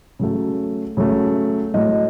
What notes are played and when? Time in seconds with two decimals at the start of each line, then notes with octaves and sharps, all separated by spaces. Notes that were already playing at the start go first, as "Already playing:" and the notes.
0.19 C#3 F#3 A3
0.97 C#3 F#3 A3
1.74 A2 F#3 A3 D#5